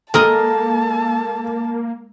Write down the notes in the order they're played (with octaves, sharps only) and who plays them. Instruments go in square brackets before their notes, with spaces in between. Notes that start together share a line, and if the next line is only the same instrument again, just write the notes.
[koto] G#3 A#4 D#5 [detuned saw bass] A#3 [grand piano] A4 [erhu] A5